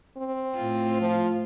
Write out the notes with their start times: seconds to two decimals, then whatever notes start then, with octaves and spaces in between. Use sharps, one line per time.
0.17 C4
0.55 A2 F4
1.01 F3